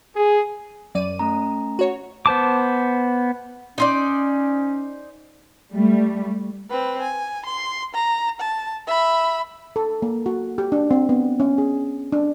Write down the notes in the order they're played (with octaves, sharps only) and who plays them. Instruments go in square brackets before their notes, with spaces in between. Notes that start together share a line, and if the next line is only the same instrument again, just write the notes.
[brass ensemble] G#4
[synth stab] F#2 D5 D#7
[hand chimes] A3 C#4 A#5
[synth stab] F#4 C#5
[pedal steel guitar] B3 C5 A5 D6
[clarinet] C#4 [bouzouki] D#4 C5 D5
[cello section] G3 A3
[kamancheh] C4 B4
G#5
C6
A#5
A5
E5 B5
[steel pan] A4
A#3
F#4
G4
D4
C4
B3
C#4
G#4
D4